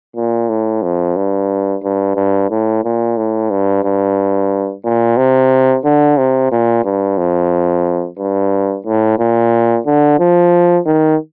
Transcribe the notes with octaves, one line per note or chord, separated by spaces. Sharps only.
A#2
A2
F2
G2
G2
G2
A2
A#2
A2
G2
G2
A#2
C3
D3
C3
A#2
G2
F2
G2
A2
A#2
D3
F3
D#3